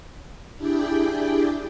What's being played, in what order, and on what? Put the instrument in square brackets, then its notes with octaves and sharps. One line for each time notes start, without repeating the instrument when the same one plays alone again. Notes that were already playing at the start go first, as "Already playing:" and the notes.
[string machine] D4 E4 G4 G#4 D5 G5